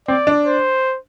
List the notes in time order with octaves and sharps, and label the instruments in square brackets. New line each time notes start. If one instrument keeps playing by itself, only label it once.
[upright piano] C4 [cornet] D5
[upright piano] D4
[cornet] C5